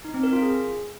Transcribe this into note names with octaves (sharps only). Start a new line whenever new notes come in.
D#4
C4
A#4
F4
G#4